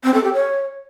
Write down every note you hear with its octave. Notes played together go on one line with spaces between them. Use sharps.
C4
A4
G4
C#5